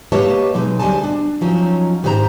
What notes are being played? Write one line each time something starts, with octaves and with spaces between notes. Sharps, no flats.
A#3 G4 B4 C#5 D#5 A5
B2 F#3 G#3 D#4
D2 G2 G3 D#5 G#5 A5
D4
F3 F#3 C#4 D#4
G#2 D#3 G4 G#4 C5 A#5